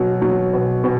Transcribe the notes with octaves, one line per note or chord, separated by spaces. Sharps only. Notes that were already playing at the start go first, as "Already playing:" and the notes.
Already playing: B2 F#3
F#3
B2
B2